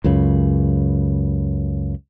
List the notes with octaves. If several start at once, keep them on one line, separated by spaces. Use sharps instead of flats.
C#2 F#2 C#3